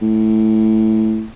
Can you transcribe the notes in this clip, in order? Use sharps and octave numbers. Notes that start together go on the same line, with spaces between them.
A2